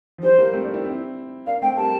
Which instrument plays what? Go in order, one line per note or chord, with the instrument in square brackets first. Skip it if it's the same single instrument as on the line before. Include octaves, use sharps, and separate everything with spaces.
[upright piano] F3
[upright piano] E3 G3 [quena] C5
[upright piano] G3 A#3
A3 C4
A#3 D4
C4 E4
C4 E4
[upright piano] A#3 D4 [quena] F5
[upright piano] A3 C4 [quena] G5
[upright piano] G3 A#3 [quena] A5